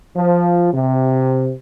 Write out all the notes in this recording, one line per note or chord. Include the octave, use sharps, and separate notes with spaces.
F3
C3